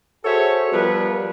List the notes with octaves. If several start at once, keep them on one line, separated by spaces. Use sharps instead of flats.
F#4 G#4 A4 C5 C#5 E5
F3 G3 B3 A#4 B4